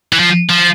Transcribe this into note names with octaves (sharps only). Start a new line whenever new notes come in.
E3
F3
F3